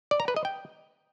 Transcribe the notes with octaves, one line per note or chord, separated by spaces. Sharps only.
D5
A#5
B4
D#5
G5